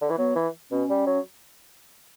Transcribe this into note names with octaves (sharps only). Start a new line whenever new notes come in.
D3
E3
F#3 B3
E3
B2 C#4
G3
F#3